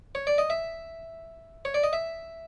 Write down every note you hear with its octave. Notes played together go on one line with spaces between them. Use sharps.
C#5
D5
D#5
E5
C#5
D5
D#5
E5